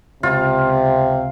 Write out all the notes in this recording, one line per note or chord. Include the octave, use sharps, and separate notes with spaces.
C#2 C3 F4